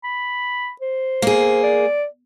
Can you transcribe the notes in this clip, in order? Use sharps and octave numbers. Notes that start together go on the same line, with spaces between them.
B5
C5
A#3 G#4
D5